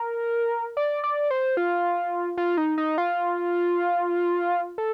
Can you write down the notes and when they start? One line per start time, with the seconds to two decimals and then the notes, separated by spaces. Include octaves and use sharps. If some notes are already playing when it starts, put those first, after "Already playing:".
Already playing: A#4
0.77 D5
1.04 D5
1.30 C5
1.57 F4
2.38 F4
2.57 D#4
2.78 D#4
2.98 F4
4.78 A4